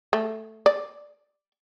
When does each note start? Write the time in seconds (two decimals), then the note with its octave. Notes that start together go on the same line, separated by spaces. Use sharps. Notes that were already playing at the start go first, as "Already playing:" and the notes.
0.13 A3
0.66 D5